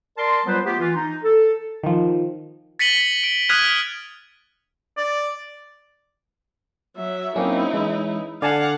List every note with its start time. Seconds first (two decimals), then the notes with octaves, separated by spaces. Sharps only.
0.18 A#4 D5 A5 C6
0.46 F#3 G3 B3 F4 B4 C5
0.65 A3 B3 F4 G4
0.80 E3 F4
0.96 D#4
1.24 A4
1.83 D#3 F3
2.79 A6 B6 C#7 D#7 F#7 G7
3.24 D7
3.49 D#6 F6 F#6 G#6 B6 D#7
4.97 D5
6.96 F#3 E5
7.36 F#3 A#3 C4 C#4 D#4 E4
7.74 E3 G#3
8.42 D3 D5 F5 F#5 G#5 A5